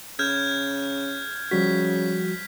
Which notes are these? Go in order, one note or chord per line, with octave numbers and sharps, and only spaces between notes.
C#3 F6 G6 G#6
C#3 F3 G3 F#4 B6